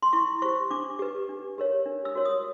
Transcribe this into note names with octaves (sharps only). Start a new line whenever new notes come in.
C6
E4 C#6
G4 C5 C#6
D4 D6
G4 B4
D4
G4 A#4 C#5
D4
E6
F#4 A#4 C#5
D#6